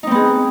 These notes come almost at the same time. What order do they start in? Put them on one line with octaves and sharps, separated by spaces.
D#4 C4 B3 G#4